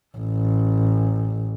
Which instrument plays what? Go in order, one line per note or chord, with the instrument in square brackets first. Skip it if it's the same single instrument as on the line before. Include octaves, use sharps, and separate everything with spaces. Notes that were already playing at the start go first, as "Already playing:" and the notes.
[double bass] A1